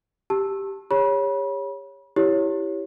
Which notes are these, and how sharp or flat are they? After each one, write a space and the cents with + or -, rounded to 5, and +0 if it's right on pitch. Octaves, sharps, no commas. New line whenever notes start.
G4 +0 A5 +5 E6 +0
G4 +40 C#5 -5 B5 -35
E4 +0 G4 +0 C#5 +0